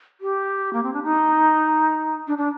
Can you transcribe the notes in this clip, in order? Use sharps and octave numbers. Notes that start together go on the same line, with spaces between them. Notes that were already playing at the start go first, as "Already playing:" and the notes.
G4
A#3
C4
D4
D#4
D4
D4